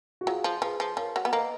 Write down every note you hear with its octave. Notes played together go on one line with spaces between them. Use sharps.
F#4
F#3 F4 G#4
F3
F3 G#4 B4
F3
F3 A#4 C#5
F#3
B3
A#3 B4 D#5